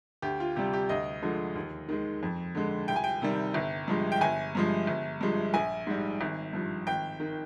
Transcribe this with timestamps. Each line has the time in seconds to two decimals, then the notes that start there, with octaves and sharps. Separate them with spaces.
0.22 D2 G4
0.40 F4
0.56 C3 G3 G4
0.73 G4
0.89 D2 D#5
1.22 D3 F3 G#3
1.55 D#2
1.89 D#3 G#3
2.23 F2
2.55 D3 G#3
2.88 C2 G5
2.96 G#5
3.04 G5
3.22 C3 D#3 G3
3.54 G1
3.88 G2 F3 G#3
4.12 G5
4.21 G1 G#5
4.55 G2 F3 G#3
4.87 G1
5.21 G2 F3 G#3
5.54 A#1 G#5
5.87 G#2 G3
6.21 G#1
6.53 G2 F3
6.87 G#1 G5
7.20 D#3